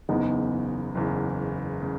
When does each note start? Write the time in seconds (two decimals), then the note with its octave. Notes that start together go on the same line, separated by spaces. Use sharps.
0.09 F#1 E2 C#3 B3 D#4
0.95 F#1 E2 C#3
1.82 C#3